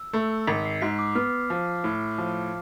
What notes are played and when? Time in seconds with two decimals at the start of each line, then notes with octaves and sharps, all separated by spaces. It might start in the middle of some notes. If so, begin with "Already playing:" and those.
Already playing: E6
0.13 A3
0.47 G#1 B6
0.65 C7
0.81 G#2 B6
0.99 D6
1.15 B3 F6
1.50 F3
1.84 A2
2.18 F3